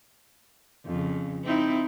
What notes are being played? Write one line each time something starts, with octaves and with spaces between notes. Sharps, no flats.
F2 C#3
C4 D#4 E4